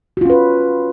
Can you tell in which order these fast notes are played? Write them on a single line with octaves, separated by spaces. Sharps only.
F#4 F4 C#4 B4